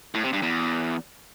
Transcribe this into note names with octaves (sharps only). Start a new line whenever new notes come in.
A2
C3
G2
E2